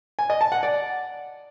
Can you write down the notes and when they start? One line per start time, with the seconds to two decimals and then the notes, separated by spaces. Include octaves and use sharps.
0.19 G#5
0.30 D#5
0.41 A5
0.52 F#5
0.63 D5